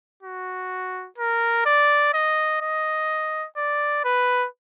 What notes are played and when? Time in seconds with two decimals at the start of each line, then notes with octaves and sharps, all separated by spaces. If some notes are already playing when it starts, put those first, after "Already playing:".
0.23 F#4
1.18 A#4
1.66 D5
2.14 D#5
2.61 D#5
3.57 D5
4.04 B4